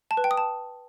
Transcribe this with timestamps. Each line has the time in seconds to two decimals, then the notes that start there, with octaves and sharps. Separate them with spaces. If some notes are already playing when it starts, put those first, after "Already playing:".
0.11 A5
0.17 B4
0.24 G5
0.31 D#6
0.37 A5